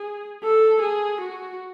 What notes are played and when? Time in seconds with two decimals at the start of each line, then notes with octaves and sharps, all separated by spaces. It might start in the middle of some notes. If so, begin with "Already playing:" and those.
Already playing: G#4
0.43 A4
0.82 G#4
1.21 F#4